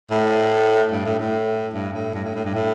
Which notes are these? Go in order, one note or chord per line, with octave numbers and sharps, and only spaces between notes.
A2
G2
A2
A2
G2
A2
G2
A2
A2
G2
A2